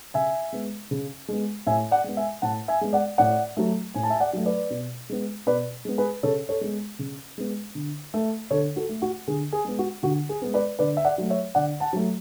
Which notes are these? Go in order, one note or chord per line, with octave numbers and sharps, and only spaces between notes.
C#3 E5 G#5
G#3 B3
C#3
G#3 B3
A2 E5 G#5
D5 F#5
G#3 B3
E5 G#5
A2 F#5 A5
E5 G#5
G#3 B3
D5 F#5
A2 D5 F#5
F#3 A3
A2 G#5
A5
E5 G#5
D5 F#5
F#3 A3
B4 D5
B2
G#3 B3
B2 B4 D5
G#3 B3
G#4 B4
C#3 A4 C#5
A4 C#5
G#3 B3
C#3
G#3 B3
D3
A3
D3 A4 C#5
F#4 A4
A3
F#4
D3 G#4
G#4
G#3 B3
F#4
D3 F#4
G#4
G#3 B3
B4 D5
D3 B4 D5
E5
D5 F#5
F#3 A3
C#5 E5
D3 D5 F#5
F#5 A5
F#3 A3